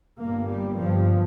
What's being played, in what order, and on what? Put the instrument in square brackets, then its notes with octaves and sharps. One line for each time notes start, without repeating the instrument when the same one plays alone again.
[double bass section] G1 G2 A#3
G3
G1 G2 F3